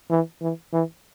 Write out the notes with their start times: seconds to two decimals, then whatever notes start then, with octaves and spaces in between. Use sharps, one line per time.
0.10 E3
0.42 E3
0.73 E3